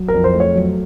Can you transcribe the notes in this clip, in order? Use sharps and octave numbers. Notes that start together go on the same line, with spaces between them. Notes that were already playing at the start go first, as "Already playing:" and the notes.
Already playing: F#3
A#4
F2
C5
A3
C#5
F#3